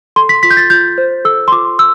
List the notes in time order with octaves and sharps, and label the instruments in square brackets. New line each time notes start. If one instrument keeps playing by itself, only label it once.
[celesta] A4 C6
B6
F4 B6
G6
A6
F4 G6
C5
A4 E6
C6
F4 D6
E6